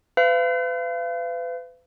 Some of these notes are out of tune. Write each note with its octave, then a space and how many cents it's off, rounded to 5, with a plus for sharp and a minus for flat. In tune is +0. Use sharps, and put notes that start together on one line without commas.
B4 +40 F5 -35